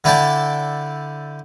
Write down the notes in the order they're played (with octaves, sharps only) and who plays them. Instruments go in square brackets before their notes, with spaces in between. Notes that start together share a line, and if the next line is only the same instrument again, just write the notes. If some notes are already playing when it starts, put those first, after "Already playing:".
[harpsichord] D3 E4 D5 G5 A5